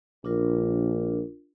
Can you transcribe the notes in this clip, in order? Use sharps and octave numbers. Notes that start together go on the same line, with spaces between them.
A#1 D4 F4 A#4